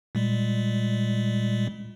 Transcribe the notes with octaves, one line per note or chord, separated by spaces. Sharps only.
A#2 G3 G#3